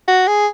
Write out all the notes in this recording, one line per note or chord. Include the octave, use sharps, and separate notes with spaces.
F#4
G#4